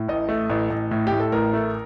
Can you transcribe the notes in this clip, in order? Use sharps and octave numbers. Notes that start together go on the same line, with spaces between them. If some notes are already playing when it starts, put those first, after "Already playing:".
Already playing: A2
A1 D#5
A3
A1
A1
A2
G4
A2
A4
A1 A#4
A3